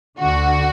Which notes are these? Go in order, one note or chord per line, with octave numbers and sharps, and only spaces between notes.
D2 D3 F#4